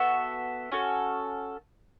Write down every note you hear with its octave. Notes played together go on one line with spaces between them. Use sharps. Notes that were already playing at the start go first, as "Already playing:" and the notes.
Already playing: B3 F#4 A4 E5
C#4 F#4 A4